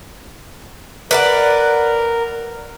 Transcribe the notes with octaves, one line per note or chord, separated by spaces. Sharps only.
A#4 B4 D5 F#5